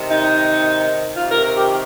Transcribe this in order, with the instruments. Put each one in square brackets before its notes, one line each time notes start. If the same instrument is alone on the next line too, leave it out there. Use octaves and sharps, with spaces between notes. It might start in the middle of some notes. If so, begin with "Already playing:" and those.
Already playing: [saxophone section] C3 D#3
D#4
C3 D#3 F4
A#4
A#4
G4